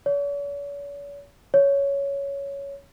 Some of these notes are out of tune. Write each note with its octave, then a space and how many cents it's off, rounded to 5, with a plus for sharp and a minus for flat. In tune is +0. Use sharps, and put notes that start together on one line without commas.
C#5 +45
C#5 +10